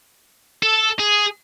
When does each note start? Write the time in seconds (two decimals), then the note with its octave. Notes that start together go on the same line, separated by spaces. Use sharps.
0.63 A4
1.00 G#4